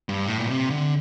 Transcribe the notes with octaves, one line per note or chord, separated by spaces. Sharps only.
G2
A2
A#2
C3
D3